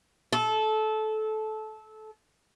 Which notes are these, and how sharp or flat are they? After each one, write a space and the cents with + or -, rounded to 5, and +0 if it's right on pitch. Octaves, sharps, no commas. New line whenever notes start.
A4 -20